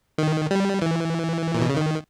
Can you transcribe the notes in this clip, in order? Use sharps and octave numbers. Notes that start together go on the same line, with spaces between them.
D#3
G3
E3
A#2
B2
C#3
D#3